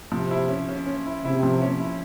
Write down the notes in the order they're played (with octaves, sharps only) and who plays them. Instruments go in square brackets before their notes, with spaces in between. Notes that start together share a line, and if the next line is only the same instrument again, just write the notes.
[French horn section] C3 [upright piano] F3
[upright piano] E4
C#4
C#4
C#4
E4
[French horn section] C3 [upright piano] E4
[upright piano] F3
C#4
E4